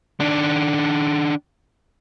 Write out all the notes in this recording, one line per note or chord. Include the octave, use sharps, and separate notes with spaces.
D#3 D4